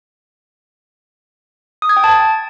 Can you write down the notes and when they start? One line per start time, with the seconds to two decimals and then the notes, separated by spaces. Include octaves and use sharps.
1.82 D#6
1.89 G#6
1.97 G5
2.04 A5